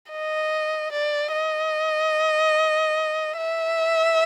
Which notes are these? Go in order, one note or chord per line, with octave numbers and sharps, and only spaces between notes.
D#5
D5
D#5
E5